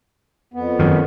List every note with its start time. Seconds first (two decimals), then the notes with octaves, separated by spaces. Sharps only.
0.54 F2 B3
0.79 F#2 D#3